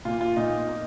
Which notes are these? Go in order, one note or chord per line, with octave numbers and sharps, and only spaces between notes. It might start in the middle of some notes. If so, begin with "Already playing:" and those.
A#2 A#3 F4
F4
A#2 A#3 D#4
A#3